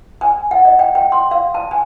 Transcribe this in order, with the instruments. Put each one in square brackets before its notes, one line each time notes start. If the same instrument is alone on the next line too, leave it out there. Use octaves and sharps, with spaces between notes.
[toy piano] G#5
F#5
D#5
G5
G5
C6
F5
A5
G#5